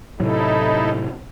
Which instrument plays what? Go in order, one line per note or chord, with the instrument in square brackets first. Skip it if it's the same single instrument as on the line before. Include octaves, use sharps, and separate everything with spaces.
[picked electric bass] A2 C3 F#3 [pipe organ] D#4 E4 A4